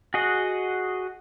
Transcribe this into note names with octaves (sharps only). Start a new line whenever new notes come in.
F#4 G#4 D#5 F#5